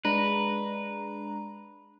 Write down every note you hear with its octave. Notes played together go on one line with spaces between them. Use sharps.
G#3 D4 B4 A#5